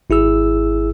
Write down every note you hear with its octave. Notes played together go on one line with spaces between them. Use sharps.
G#1 E4 G#4 E6